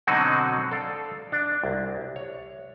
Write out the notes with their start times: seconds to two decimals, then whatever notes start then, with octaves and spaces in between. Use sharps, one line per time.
0.07 B2 D3 F#3 C4 D#4 F#4
0.72 A4 D5 F5
1.32 D4
1.63 C2
2.16 C#5